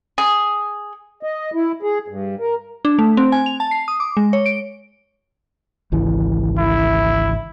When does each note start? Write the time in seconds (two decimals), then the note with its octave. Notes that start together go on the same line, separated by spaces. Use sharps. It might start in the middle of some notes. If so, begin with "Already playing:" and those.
0.18 G#4
1.23 D#5
1.54 E4
1.83 G#4
2.08 G2
2.40 A#4
2.85 D4
2.99 A3
3.17 C4
3.32 G#5
3.46 F7
3.60 A5
3.71 C7
3.88 D#6
4.00 D6
4.17 G#3
4.33 C#5
4.46 D7
5.92 G#1 C#2 E3
6.58 E4